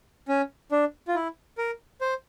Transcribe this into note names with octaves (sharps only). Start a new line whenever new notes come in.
C#4
D4
F4
E4
A#4
C5